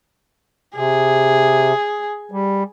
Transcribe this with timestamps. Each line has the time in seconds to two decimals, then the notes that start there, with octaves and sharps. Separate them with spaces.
0.76 C3 G#4
2.32 G3